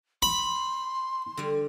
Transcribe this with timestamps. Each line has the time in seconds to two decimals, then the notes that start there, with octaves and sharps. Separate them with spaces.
0.22 B5 C6
1.37 D3 G3